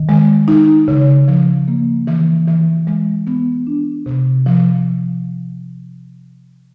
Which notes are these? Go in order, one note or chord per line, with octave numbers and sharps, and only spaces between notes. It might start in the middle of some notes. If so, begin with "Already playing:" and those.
Already playing: D#3
G#3
D#4
C#3
F3
A#3
E3
E3
G#3
B3
D4
C3
F3